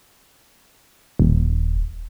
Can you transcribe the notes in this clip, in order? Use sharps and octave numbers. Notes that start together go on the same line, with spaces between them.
D#1